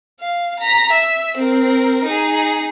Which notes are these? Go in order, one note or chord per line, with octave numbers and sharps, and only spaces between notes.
F5
A#5 B6
E5
C4 A#4
D#4 G#4